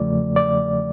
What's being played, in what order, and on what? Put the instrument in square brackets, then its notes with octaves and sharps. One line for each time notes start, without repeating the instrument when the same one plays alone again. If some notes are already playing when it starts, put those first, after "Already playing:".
Already playing: [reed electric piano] E2 C#3 F3 A3 D5
D5